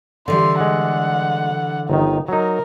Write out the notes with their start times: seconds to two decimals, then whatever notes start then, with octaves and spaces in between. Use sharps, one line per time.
0.28 D3 E3 G3 C6
0.61 G#3 F#5
1.90 G1 D#3 D#4
2.28 F#3 D#4 A#4